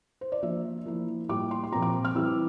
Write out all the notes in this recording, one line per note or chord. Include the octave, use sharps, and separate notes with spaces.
C5
D5
F3 A#3 D4 F4 E5
F3 A#3 E4
A2 G3 A#3 F4 D6
C6
C6
A#2 F3 C4 F4 A#5
D6
F6
E3 G3 C4 E4 E6